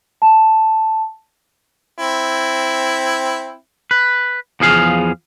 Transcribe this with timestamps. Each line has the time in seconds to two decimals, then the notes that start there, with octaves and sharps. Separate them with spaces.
0.22 A5
1.99 C4 E4
3.91 B4
4.60 E2 F3 G#4 F5